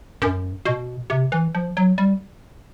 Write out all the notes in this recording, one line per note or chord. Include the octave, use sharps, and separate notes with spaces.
F#2
B2
C3
E3
F3
F#3
G3